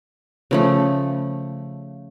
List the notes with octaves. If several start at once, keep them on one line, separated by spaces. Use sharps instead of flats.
C#3 F3 A3